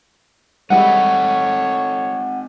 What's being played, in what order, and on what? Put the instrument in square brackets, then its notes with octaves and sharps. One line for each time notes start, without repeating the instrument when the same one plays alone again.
[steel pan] G3 G#3 E4 [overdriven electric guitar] C4 D#4 [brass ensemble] A4 C#5 [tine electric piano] F#5